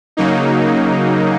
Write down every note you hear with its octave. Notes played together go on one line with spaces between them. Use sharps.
C#3 F#3 A#3 D#4